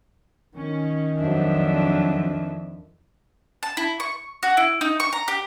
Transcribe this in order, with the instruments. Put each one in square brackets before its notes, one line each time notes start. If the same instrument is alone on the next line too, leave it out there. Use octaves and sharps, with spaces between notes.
[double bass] D#3 [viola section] C#4
[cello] F2 [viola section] F3 D4 E5 [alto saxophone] F#3
[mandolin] A5
E4
C#6
F#4
E4
D#4
C#6
A#5
G4